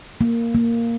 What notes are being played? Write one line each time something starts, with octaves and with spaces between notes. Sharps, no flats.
A#3
A#3